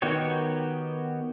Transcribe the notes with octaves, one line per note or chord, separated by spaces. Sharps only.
D#3 B3 F#4 G4 C#5